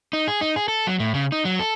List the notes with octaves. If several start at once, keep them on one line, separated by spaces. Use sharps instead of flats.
D#4
G#4
D#4
G#4
A4
F#3
A2
C#3
D#4
F#3
A4